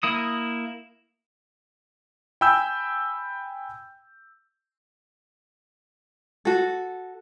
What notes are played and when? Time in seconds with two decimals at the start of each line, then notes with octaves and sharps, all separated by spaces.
0.03 A#3 E4 D#6
2.41 G5 G#5 B5 E6 G6
6.45 F#4 A4